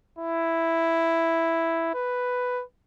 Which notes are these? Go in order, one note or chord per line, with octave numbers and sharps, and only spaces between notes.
E4
B4